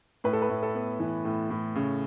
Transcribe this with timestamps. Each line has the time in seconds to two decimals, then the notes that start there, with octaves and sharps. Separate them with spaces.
0.24 A2 B4
0.33 A4
0.42 B4
0.49 A2
0.63 A4
0.75 B3
0.99 E3
1.25 A2
1.50 A2
1.76 C#3